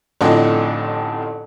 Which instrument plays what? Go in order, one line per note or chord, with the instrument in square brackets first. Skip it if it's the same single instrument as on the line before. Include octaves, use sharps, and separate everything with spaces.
[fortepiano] A1 F2 A2 D3 D#4 F4